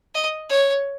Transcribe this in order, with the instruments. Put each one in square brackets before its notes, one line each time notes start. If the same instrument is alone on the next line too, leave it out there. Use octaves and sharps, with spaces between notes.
[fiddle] D#5
C#5